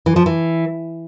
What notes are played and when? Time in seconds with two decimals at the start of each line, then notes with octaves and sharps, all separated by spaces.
0.06 E3
0.16 F3
0.26 E3